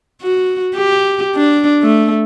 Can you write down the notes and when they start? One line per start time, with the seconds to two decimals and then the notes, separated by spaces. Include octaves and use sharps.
0.22 F#4
0.75 G4
1.36 D4
1.83 A3